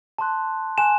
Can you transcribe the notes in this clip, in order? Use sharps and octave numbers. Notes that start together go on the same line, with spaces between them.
A5 C6 F#6
G#5 C6 F#6 E7